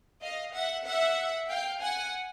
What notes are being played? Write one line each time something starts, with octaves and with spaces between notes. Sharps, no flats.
D#5 F5
E5 F#5
E5 F#5
F5 G5
F#5 G#5